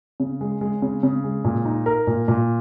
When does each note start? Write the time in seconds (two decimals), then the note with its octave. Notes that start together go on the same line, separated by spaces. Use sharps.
0.20 C#3
0.41 G#3
0.61 G#3
0.82 C#3
1.03 C#3
1.24 G#3
1.45 A#2
1.65 D#4
1.86 A#4
2.07 A#2
2.28 A#2